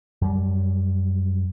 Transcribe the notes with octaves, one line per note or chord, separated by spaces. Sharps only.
F#2 G3